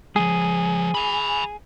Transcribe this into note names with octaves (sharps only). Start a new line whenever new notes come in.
F3 G#3 G#4
G#5 B5